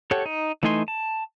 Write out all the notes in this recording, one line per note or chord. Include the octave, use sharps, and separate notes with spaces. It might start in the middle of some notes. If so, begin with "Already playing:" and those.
G4 A4 C#5 F#5
D#4
E3 A3 D#4 G#5 C6
A5